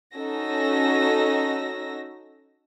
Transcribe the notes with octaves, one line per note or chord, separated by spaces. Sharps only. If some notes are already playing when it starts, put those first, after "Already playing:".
C#4 D#4 F#4 A4 E6 A#6